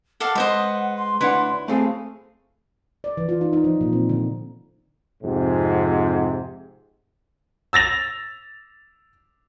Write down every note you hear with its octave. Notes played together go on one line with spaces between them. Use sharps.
A4 D5 F5 F#5
G#3 B4 C5 D#5
C6
D2 D4 E4 B4 C#5 F#5 C6
A3 C4 G#4 F5
D5
E3
F4
D#4
D#4
F3
A#2
C4
D3
F2 G#2 C3
E6 A6 A#6 F7